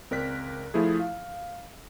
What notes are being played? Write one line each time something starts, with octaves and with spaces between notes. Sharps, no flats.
C#2 C4 A#4 D5 F#6 B6
F3 A3 E4 G#4
F5